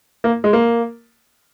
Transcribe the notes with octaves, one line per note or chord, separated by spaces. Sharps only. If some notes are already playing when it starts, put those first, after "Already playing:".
A#3
G#3
A#3